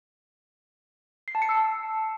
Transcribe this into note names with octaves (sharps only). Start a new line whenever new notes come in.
C7
A5
C#7
E6